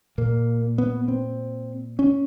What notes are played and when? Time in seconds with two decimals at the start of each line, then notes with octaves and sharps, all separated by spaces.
0.18 A#2 A#3
0.78 B3
1.08 C4
1.99 C#4